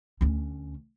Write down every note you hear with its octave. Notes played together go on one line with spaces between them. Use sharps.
D2 C#4